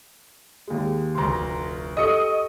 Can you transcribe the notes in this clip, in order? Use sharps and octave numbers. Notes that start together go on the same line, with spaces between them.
D#2 G#3
F1 D2 A#5 C6
G4 A4 D#5 C#6 E6 C#7